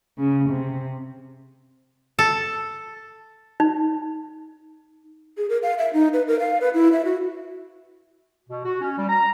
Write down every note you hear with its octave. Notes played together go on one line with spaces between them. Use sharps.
C#3
C3
A4
D#4
G#4
A#4
F5
E5
D#4
B4
A#4
F5
B4
E4
E5
F#4
B2
F#4
C#4
G3
A#5